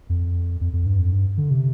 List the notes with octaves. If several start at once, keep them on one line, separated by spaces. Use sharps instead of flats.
F2
F2
F2
G2
F2
G2
D3
C3